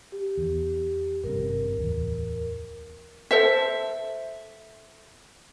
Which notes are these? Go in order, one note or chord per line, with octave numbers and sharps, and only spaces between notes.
G4
E2
G#1 G2 C3 A#4
D1 E2
A4 C5 E5